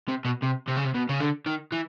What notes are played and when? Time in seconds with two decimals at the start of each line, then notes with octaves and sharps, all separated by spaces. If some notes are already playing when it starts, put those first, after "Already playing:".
0.08 C3
0.25 B2
0.43 C3
0.68 C3
0.77 C#3
0.85 C3
0.95 B2
1.09 C#3
1.21 D3
1.46 D#3
1.72 E3